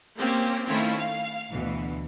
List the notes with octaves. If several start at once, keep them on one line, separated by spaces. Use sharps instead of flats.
A#3 C4 C#4 G4
D#3 A3 C4 C#4 E4 F4
F5
D2 B2 E3